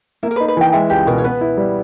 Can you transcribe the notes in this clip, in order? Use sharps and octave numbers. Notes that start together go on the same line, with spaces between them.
A#3 E4
A#4
B4
D#4
B4
E3 G5
G#3 E5
C#2 G4
B2 A#4
C#5
B3 B4
E4
G3